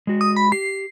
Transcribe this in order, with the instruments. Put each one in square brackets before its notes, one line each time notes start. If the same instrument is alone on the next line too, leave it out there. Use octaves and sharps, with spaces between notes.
[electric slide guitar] G#3 F#4
[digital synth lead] D#6
B5
[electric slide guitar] G4 [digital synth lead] C7